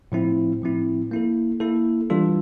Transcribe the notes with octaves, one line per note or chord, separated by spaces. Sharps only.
A2 F3 C4 E4
A2 F3 C4 E4
A#3 E4 A4
A#3 E4 A4
E3 G3 D4 F4 A4